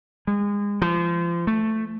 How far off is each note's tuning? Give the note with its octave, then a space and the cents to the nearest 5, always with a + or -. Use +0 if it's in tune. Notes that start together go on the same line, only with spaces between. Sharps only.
G#3 -30
F3 -30
A3 +5